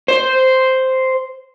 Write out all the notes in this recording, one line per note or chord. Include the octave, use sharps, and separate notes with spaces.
C5